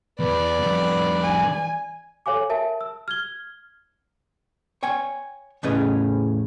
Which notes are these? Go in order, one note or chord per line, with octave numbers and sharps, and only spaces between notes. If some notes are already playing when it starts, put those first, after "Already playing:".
E2 B4 D5
F2 G3
G#5
A4 C#5 F5 G#5 D6
A#4 E5 A5
E6
F6 G#6 G7
C#5 G5 G#5
E2 A2 C#3 C#4 B4 D#5